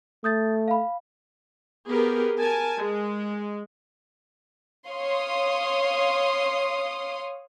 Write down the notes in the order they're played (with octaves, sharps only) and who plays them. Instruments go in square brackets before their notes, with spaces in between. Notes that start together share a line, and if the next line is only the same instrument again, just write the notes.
[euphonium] A3 [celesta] D#6 G6 A6
[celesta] F5 B5
[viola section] B3 G4 G#4 A#4
A#4 G#5 A5
G#3
[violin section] C#5 F5 C6 D#6